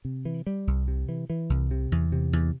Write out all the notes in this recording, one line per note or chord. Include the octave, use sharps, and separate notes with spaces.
C3
E3
G3
C2
C3
E3
E3
C2
C3
E2
C3
E2